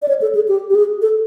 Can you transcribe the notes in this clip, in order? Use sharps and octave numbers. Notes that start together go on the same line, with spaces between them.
D5
C#5
A4
G#4
G4
G4
G#4
A4